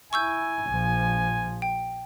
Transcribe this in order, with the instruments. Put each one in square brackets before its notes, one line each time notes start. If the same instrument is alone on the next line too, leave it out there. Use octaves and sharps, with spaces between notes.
[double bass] E4 [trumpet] G#5 [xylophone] C#6 E6 G6
[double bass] A#1 F3
[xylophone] G5